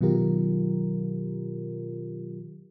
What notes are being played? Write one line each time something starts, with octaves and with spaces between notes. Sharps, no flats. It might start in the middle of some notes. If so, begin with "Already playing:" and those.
B2 D#3 F#3 F4 G4 A#4